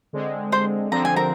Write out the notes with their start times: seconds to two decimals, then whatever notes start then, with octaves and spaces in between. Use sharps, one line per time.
0.13 D3 G#3 C4
0.52 C5 C6
0.91 D3 F3 C4 A#5
1.05 G#5
1.16 A#4 A#5